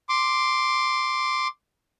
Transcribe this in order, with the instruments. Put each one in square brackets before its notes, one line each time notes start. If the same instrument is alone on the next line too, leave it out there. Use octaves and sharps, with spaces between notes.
[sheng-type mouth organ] C6 D6